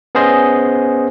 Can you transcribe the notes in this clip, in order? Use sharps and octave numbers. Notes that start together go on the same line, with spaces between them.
B3 C#4 G#4 C5 D#5